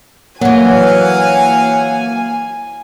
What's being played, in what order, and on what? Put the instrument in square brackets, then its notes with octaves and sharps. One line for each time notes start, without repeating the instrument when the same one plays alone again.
[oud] E3 F#3 [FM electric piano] A#3 [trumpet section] F5 F#5 [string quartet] G#5